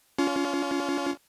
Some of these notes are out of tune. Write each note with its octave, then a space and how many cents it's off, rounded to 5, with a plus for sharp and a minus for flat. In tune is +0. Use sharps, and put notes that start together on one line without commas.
C#4 +35 F4 +0